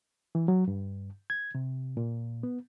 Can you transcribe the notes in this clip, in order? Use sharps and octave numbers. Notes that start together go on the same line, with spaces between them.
E3
F#3
G2
G#6
C3
A#2
B3